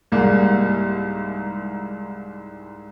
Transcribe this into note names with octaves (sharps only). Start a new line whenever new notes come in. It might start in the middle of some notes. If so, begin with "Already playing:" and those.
C2 G#2 G3 G#3 A#3